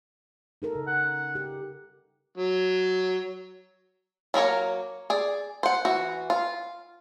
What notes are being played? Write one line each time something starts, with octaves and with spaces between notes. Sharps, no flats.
D#4 A4 A#4
C#3
F#5
G4
F#3
F#3 A#3 A#4 C#5
G#4 D5
C5 F#5
E3 F#4
F4